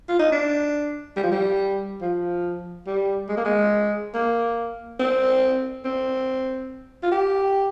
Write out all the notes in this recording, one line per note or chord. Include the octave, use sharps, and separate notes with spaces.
F4
D#4
D4
G3
F3
G3
F3
G3
G#3
A#3
G#3
A#3
C4
C4
F4
G4